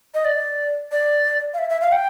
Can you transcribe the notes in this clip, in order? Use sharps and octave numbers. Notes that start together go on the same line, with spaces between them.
D#5
D5
D5
F5
E5
E5
F5
G5